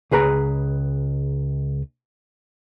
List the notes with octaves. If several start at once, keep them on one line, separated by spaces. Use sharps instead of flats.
C#2 G#4 B4 A#5